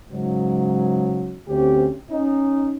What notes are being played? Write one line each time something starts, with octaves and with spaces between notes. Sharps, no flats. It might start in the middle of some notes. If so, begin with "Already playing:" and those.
G#2 C#3 F#3
D2 C4 C#4 G4
C#4 D#4